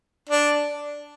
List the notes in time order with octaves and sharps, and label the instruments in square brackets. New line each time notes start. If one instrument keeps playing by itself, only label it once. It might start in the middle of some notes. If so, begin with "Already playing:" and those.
[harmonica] D4